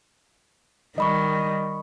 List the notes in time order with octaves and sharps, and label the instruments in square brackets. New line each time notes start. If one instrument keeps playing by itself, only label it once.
[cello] D#3 G3 [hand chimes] D#5 B5 C#6